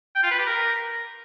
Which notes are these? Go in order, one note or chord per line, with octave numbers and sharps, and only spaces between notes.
G5
F4
B4
G4
A#4